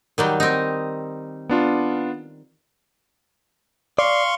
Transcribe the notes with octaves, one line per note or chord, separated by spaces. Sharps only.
D#3 F#3 G3
C4 D#4
B3 D4 F4
D5 F5 C6 C#6